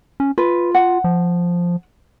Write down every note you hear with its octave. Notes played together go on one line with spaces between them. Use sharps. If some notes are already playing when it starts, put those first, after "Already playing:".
C#4
F4 B4
F#5
F3